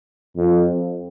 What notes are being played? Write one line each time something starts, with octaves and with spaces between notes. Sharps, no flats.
F2